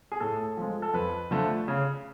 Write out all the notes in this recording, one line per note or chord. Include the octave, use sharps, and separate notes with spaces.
G#4
A2 A4
F3 G#3
A4
F2 B4
D3 F3 A3
C#3